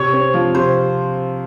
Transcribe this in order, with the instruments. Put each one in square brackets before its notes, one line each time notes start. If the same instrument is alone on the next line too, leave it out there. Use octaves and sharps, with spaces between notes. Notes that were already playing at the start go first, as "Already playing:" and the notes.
Already playing: [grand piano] C3 [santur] C#5
[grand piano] C4
F3
[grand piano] C3 [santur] C5